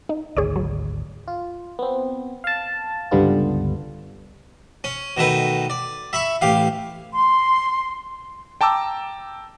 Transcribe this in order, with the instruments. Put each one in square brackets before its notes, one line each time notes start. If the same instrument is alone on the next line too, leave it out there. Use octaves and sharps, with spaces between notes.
[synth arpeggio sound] D#4
[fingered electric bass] G#1 D2 [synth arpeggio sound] G#4 C#5 D5
[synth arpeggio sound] F#3
[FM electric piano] F4
B3 C4
F5 A5
C#2 G2 D3 G3 B3 F4
[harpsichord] C#4
B2 D#3 A3 B4
D5
E5 B5 C#6
A1 G4 F5
[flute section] C6
[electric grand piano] G5 A5 A#5 D6 E6